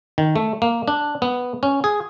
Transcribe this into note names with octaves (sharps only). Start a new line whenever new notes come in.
D#3
A3
A#3
D4
B3
C#4
G#4